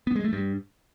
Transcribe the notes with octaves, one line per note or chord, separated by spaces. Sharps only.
B3
G#3
A3
G2